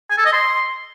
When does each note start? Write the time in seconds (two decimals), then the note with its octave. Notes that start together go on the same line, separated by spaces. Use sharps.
0.10 G#5
0.18 A4
0.25 D#5
0.33 C6